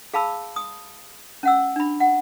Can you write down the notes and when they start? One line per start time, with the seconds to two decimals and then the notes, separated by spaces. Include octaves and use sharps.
0.14 G#4 F5 A5 B5 E6
0.56 D#6
1.43 C#4 F#5 E6
1.76 D4 B5
2.00 F#5